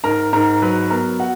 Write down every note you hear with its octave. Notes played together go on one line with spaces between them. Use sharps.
G#2 A#4 A#5
G#2 A#4 A#5
F#3 B4 B5
B3 A#4 A#5
F#4 F#5